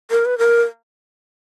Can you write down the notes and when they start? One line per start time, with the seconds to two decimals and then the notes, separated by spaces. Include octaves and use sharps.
0.11 A#4
0.26 B4
0.38 A#4